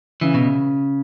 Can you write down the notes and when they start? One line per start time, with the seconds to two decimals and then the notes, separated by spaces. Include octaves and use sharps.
0.21 C#3 E3
0.34 B2